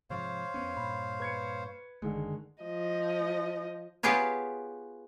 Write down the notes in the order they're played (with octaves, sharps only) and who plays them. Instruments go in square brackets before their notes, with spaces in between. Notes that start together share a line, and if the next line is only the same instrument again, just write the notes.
[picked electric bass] G#2 C3 F3 [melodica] C5 C#5 F5
[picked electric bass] F2 B3 C#4
[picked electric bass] G2 A#2 [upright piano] B5
[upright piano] B4 G#6 C#7
[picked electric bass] F#1 [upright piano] D3 D#3 G#3
[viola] F3 D#5
[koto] B3 F4 G4 G#4 B4 C#5